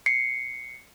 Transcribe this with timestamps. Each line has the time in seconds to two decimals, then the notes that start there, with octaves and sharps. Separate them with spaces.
0.06 C7 C#7